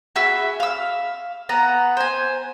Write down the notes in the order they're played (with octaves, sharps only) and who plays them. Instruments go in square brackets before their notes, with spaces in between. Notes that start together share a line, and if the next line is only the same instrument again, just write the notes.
[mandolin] F#4 G#4 E5 B5
F5 E6
B3 F#5 A#5
C5 G#5